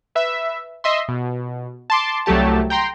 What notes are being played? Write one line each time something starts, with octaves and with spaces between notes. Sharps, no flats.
B4 E5
D#5 E5 C6
B2
A5 C6 D6
C2 F#3 A3 G4 A5
G5 A#5 C6